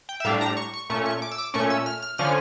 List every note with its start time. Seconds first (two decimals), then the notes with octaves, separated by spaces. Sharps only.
0.09 G5
0.20 E5
0.25 A2 G3 D4 F5
0.41 A#5
0.57 C#6
0.74 C#6
0.90 A#2 A3 C#4 C#6
1.06 C#6
1.22 D6
1.32 E6
1.38 D6
1.54 A#2 A3 C#4 C#6
1.70 E6
1.86 F6
2.02 F6
2.18 D3 F3 C#4 F6